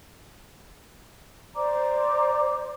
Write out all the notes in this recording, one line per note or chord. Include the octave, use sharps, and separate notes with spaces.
C5 D5 A#5 D6